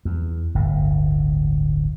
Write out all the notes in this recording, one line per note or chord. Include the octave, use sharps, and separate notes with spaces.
E2
D1 G1 A2